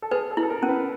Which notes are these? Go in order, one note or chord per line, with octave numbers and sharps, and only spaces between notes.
A4
G#4 B4
A4
E4
A4
A#4
C#4
B4